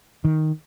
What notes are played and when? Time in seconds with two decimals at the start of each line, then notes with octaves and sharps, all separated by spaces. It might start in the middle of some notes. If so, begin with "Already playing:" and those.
0.25 D#3